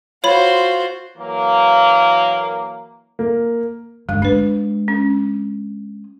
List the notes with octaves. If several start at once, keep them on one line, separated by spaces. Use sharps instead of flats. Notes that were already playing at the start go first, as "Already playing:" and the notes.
F4 F#4 C5 C#5 B5
E3 F#3 A#3
A#3
G1 G#3
G#3 D4 B4
C#4